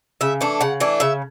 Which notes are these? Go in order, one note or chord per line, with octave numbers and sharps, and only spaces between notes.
C#3 E5
E3 A3 D4
C#3 F#5
E3 A3 D4
C#3 E5